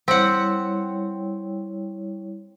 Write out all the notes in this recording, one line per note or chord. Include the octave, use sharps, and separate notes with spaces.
G3 C4 E4 C#5 F#5